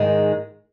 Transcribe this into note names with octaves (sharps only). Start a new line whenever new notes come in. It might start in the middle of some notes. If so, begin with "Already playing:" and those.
Already playing: G#2 D#3 G#3